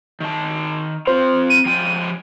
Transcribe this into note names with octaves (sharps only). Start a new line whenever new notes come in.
D#3 A5
C4 F4 C5
D#7
F3 G#3 G5